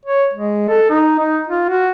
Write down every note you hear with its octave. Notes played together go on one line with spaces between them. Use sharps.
C#5
G#3
A4
D#4
D#4
F4
F#4